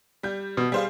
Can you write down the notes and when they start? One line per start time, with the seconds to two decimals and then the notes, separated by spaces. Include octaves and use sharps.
0.23 G3 G6
0.57 B2
0.72 G3 G#4 C5 F5